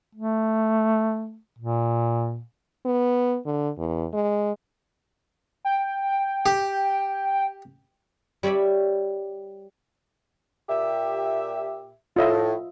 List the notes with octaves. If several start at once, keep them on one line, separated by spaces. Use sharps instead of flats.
A3
A#2
B3
D3
E2
G#3
G5
G4
G3 C#5 D5 E5 B5
A#2 G4 E5
A2 F4 D#5 E5